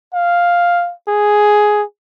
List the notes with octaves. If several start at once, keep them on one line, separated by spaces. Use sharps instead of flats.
F5
G#4